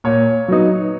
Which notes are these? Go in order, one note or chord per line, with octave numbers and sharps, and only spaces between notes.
A#2 C#5
F#3 B3 D#4